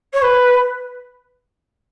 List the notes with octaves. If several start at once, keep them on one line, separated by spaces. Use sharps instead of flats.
C#5
B4